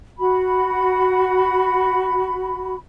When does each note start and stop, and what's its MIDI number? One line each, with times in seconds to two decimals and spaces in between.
0.19 2.76 66
0.19 2.76 83